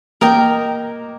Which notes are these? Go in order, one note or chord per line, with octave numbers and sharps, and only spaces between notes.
A#3 A#4 D#5 G5